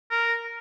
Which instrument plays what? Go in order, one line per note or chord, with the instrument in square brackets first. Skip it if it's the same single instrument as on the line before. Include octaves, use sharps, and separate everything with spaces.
[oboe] A#4